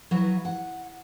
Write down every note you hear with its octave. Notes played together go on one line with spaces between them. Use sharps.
F#3 E4 F#4 B4
F#5